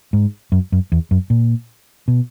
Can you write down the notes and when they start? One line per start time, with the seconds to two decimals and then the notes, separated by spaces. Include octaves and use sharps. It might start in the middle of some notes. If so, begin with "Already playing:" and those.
0.13 G#2
0.52 F#2
0.72 F#2
0.92 E2
1.11 F#2
1.30 A#2
2.08 B2